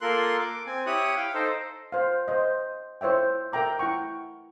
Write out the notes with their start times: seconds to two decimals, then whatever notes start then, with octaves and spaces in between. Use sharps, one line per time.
0.01 A#3 F4 A4 A#4 C6 F#6
0.38 D6
0.66 C4 G#5
0.86 E4 G4 C#5 D#6 F#6
1.16 F5 G5
1.34 D#4 A4 C5
1.92 C5 F5
2.28 C5 D#5
3.01 E4 C5 C#5 E5 G5
3.52 A#4 E5 G5 A#5 D6
3.79 E4 F#5 G5 C#6